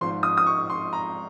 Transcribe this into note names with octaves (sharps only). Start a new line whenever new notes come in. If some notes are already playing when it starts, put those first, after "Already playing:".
G#1 G#2 F3 C6
D#6
D#6
C#6
C6
A#5